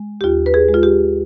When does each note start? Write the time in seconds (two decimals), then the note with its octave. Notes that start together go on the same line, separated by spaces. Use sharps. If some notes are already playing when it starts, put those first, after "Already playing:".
Already playing: G#3
0.21 G4
0.24 D#2 F4
0.46 B4
0.54 G#4
0.68 G#3
0.74 F4
0.83 G4